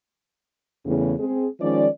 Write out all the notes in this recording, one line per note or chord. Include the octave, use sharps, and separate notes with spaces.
E2 A2 C#3
G#3 C4 G#4
D#3 F3 G#3 C#4 D5